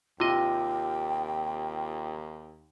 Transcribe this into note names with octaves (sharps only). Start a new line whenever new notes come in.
D#2 C3 F4 D#5 G5